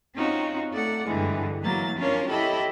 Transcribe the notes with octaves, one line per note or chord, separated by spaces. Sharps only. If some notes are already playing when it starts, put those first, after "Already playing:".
C4 C#4 D#4 F4 F#4
A3 D5 F#5
G2 D3 E3 G#3
E3 F#3 A#3 A6
C#4 D4 F4 A#4 C#5
E4 G4 A4 D#5 B5